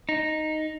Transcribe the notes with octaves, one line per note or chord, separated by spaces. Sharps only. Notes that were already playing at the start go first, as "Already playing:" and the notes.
D#4